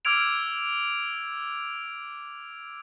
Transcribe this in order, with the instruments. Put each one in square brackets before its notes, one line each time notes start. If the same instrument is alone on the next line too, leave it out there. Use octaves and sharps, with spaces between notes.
[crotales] D6 E6 F6 G#6 D7 F7